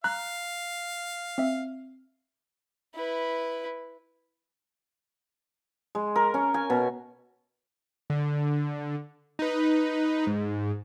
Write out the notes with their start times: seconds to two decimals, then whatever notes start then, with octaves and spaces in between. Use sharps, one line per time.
0.04 F5 A#5 F#6
1.38 C4 E5
2.94 E4 B4
5.95 G#3
6.16 A#4
6.34 C#4
6.54 G#5
6.70 B2
8.10 D3
9.39 D#4 B4
10.27 G#2